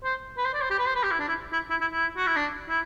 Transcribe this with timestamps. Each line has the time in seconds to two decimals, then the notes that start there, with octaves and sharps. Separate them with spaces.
0.04 C5
0.37 B4
0.45 C5
0.54 D5
0.61 C5
0.70 G4
0.79 B4
0.87 C5
0.95 B4
1.03 G4
1.11 E4
1.20 D4
1.28 E4
1.53 E4
1.70 E4
1.81 E4
1.92 E4
2.17 F#4
2.27 E4
2.36 D4
2.69 E4